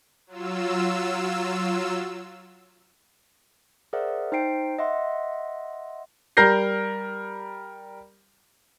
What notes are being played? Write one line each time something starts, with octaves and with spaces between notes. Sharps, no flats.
F#3 F4 E6
G#4 A#4 C5 D5 E5 F#5
D#4 C5 G5 C7 D7
D#5 E5 F#5 C6
G3 A#4 G6 A#6 C7